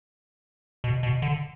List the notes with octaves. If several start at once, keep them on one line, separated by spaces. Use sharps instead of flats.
B2
B2
D3